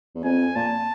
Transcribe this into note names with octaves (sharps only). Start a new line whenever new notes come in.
E2
F2 G#5
A#2 A5